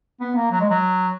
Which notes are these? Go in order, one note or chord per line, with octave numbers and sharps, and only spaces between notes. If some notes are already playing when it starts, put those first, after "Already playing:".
B3
A#3
F#3
G#3
F#3